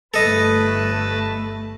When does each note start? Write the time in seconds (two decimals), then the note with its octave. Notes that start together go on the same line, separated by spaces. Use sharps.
0.14 G1 A3 A4 B4 D#5 A5